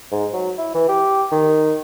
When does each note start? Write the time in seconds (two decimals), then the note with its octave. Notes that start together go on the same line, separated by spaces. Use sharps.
0.12 G#2
0.33 F#3
0.58 E4
0.74 E3
0.88 G4
1.31 D#3